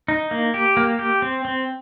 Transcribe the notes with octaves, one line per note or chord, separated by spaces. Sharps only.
D#4
A#3
G4
A#3
G4
C4
C4